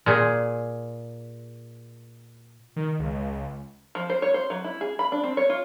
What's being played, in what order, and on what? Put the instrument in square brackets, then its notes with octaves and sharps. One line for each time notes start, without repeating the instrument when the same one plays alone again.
[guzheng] A#2 G#4
[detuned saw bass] D#3
C#2
[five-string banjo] F3
C5
C#5
C5
F#3
E4
G#4
B5
D4
C4
C#5
F4